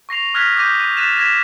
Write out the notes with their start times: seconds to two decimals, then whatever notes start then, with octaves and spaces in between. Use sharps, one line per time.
0.09 C#6 A#6 C7 F7
0.34 D#6 F6 F#6 G#6 A#6 B6
0.57 D6 D#6 G6 A#6 D#7
0.80 C#6 D#7
0.97 F#6 A6 B6 D#7 E7
1.17 G#6 A#6 B6 E7